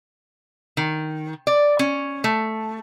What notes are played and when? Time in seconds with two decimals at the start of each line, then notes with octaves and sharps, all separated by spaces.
0.77 D#3
1.47 D5
1.79 C#4
2.24 A3